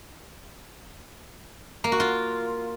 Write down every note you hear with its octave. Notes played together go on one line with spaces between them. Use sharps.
A#3
F#4
F4